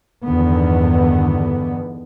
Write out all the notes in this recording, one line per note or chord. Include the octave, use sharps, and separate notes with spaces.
E2 G2 D3 D#3 B3